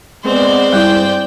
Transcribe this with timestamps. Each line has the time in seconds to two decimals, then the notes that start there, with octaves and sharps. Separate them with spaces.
0.25 G#3 B3 C4 C5 D5
0.73 G2 G3 G#3 C4 E4 G5